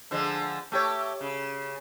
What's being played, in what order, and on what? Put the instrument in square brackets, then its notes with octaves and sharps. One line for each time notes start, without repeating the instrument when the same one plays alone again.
[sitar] D3 F3 G#3
A3 G4 C#5
C#3